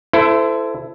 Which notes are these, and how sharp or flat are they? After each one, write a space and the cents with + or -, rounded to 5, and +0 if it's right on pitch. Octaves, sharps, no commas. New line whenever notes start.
E4 +20 A4 +0 C5 -25